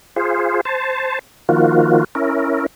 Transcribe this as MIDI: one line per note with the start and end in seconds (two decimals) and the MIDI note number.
0.16 0.61 65
0.16 0.61 68
0.16 0.61 72
0.65 1.19 72
0.65 1.19 81
1.49 2.04 51
1.49 2.04 53
1.49 2.04 58
1.49 2.04 65
1.49 2.04 66
2.15 2.66 61
2.15 2.66 64
2.15 2.66 70